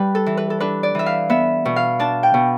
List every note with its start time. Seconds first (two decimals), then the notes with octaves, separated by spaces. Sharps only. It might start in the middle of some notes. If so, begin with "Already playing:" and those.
Already playing: G3 B4
0.15 A4
0.26 E3
0.37 B4
0.50 A4
0.60 D4 B4
0.83 D5
0.95 E3 E5
1.06 F5
1.29 B3 E5
1.65 B2
1.76 F5
1.99 D4 A5
2.23 G5
2.34 B2